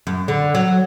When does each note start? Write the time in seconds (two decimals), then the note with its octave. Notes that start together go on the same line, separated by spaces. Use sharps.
0.07 F#2
0.28 D3
0.55 F#3